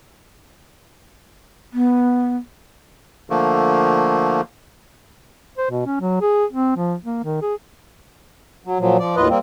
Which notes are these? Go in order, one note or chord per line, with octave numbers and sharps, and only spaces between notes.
B3
D3 F3 A3 A#3
C5
B2
C#4
F#3
G#4
C4
F3
A#3
D#3
G#4
F#3
A#2 F3 F#3
F3 D5
D#2 A2 F4 B4 D#5
G3 A#3 C4